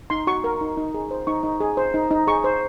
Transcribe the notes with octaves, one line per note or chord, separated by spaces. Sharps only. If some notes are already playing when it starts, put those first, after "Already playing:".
D#4 C6
F#4 C#6
A#4
D#4
D#4
G#4
C5
D#4 C#6
D#4
G#4
C5
D#4
D#4
G#4 C#6
C5